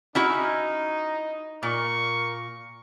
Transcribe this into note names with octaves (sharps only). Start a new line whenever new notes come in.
C#4 D#4 E4 F#4
A#2 A#4 C#6